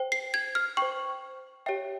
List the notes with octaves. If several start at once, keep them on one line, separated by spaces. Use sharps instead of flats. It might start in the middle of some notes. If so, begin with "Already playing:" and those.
Already playing: C5 G5
C7
G#6
F6
C5 G5 C#6
G4 C#5 E5 G5